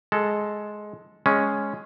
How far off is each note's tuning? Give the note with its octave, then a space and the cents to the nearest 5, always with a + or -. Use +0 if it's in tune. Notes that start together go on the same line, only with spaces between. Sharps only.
G#3 +10 A4 +0
G#3 +0 C#4 +0